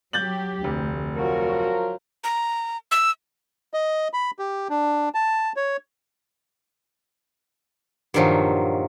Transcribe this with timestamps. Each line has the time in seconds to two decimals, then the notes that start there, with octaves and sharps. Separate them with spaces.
0.13 F#3 G4 G6 A6 F#7
0.64 F1 D2
1.16 F3 F#3 F#4 A#4
2.24 A#5
2.91 E6
3.74 D#5
4.13 B5
4.39 G4
4.69 D4
5.14 A5
5.57 C#5
8.14 G2 A#2 D#3 F3 F#3